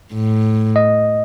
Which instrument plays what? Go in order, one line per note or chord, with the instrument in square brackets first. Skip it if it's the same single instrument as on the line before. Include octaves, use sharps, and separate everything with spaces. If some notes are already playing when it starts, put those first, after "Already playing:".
[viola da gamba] A2
[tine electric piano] D#5